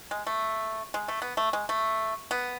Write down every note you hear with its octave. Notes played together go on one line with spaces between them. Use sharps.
G#3
A3
G#3
A3
B3
A3
G#3
A3
B3